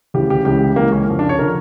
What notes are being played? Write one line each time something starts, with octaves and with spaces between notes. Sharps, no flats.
D2 C#3 E3 G4
G4
C#2 C#3 E3 G4
C#2 C#3 E3 A#3
C#4
F2 C#3 F3
D4
C#5
D3 F3 A#4